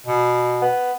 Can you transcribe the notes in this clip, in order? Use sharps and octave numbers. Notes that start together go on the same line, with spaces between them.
B2
B3